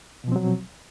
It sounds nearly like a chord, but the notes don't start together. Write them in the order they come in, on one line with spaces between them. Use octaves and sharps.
B2 F3 C4 F#3